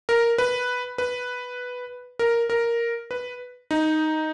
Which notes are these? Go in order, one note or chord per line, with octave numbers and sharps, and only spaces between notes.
A#4
B4
B4
A#4
A#4
B4
D#4